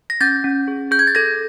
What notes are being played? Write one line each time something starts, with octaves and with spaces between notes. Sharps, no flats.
A#6
C#4 G6 A6
C#4
G#4
G#4 G6
G#6
A6
A4 G#6 A#6